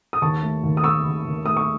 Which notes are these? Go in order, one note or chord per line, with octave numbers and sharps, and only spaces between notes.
D#6
D#2 A5 C#6
A3
D#2
D#6
A3 C#6 E6
D#2
D#2
A3 D#6
C#6